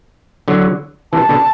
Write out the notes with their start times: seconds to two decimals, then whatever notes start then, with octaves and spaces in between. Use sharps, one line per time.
0.48 D3 F#3
1.13 C3 E3 A5
1.29 B2 D3